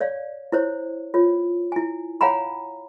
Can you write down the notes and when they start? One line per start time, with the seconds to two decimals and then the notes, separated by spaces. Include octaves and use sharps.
0.01 C#5 D5 F5
0.52 E4 C5 C#5
1.14 F4 C#5
1.72 E4 G#5
2.21 C#5 F5 F#5 G#5 A#5 B5